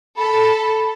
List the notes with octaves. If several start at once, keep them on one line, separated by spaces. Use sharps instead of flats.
A4 B5